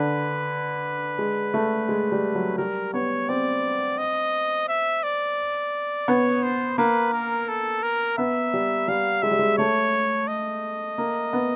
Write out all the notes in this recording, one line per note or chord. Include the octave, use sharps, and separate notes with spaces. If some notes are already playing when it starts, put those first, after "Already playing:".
Already playing: D3 B4
G#3
A3
G#3
G3
F#3
G3 A#4
B3 C#5
C4 D5
D#5
E5
D5
B3 C#5
C5
A#3 B4
A#4
A4
A#4
B3 E5
G3
G3 F5
G#3 E5
G3
G#3
A3 C#5
D#5
A#3
B3